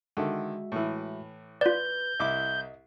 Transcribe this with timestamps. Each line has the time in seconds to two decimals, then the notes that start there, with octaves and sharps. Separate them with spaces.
0.17 D3 D#3 G#3 F#4 E5
0.72 A2 E3
1.61 F4 B4 D5 G6
2.20 C2 E4 D#5 D6